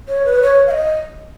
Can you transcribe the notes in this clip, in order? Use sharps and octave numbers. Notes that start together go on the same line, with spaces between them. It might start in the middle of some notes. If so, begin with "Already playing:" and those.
C#5
B4
C#5
F5
D#5